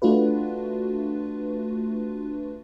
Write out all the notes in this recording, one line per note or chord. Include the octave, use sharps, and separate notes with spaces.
A3 D4 F4 F#4 B4